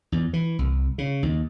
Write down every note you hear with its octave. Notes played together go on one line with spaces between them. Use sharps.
E2
E3
C2
C#3
D#2